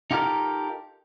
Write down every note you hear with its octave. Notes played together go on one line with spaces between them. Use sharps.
D#4 F4 G4 A4 A#4